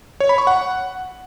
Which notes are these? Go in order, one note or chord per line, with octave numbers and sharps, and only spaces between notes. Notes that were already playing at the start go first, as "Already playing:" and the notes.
C#5
B5
C#6
F#5